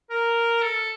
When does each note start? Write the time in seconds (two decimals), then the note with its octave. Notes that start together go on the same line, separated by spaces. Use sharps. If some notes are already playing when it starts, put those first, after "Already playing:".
0.10 A#4
0.62 A4